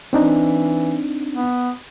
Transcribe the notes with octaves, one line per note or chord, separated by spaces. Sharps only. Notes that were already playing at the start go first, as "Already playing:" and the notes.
E3 C4 D4 D#4
B3